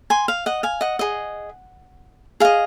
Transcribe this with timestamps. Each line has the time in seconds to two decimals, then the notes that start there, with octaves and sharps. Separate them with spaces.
0.10 G#5 C6
0.28 F5
0.46 D#5 F#5
0.63 F5 G#5
0.81 D#5 F#5
0.99 G#4 D#5
2.40 G#4 D#5 F5